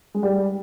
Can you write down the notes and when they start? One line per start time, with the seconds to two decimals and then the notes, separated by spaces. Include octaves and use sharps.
0.14 G#3
0.23 G3